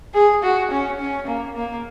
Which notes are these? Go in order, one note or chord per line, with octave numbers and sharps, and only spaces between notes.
G#4
F#4
C#4
C#4
A#3
A#3